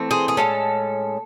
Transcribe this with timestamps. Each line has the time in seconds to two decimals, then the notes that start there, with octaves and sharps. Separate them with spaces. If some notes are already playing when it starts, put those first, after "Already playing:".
Already playing: E3 A3 C4
0.11 G#4 C5
0.28 G#4
0.37 A2 G#3 C#4 A4